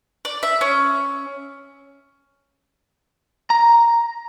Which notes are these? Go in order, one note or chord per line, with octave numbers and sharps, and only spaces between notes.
D5
E5
C#4
A#5